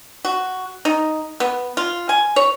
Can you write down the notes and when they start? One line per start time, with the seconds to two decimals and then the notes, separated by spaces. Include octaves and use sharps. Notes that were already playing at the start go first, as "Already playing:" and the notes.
0.25 F#4
0.85 D#4
1.40 B3
1.77 F4
2.09 G#5
2.36 C#5